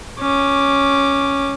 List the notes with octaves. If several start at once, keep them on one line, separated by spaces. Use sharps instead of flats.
C#4 D6